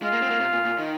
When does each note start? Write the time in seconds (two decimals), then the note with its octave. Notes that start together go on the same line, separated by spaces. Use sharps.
0.02 G#3 F4
0.13 A#3
0.22 C4
0.30 A#3
0.40 C3
0.53 A#2
0.65 A#2
0.78 D#3